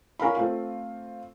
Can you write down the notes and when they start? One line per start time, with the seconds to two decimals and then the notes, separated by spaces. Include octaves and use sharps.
0.20 C#4 A#4 F5 B5
0.36 A3 C4 F4